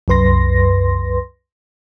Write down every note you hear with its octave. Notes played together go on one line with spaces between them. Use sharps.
C2 F#2 B4 C6 A#6